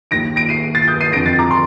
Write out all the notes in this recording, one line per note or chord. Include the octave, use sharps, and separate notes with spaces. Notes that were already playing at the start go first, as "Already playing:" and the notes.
D#2 D#3 A#6 D7
A#6 D7
C7 D#7
A6 C7
D#6 G6
C7 D#7
F2 D3 A#6 D7
A6 C7
A#5 D6
C6